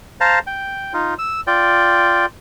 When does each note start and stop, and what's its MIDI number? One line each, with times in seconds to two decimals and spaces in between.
0.21 0.39 72
0.21 0.39 77
0.21 0.39 81
0.21 0.39 82
0.47 0.93 79
0.94 1.14 63
0.94 1.14 65
1.19 1.41 88
1.47 2.26 65
1.47 2.26 74
1.47 2.26 79